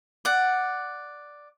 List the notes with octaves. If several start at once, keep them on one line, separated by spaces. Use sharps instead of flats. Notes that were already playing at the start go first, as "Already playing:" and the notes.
D5 F#5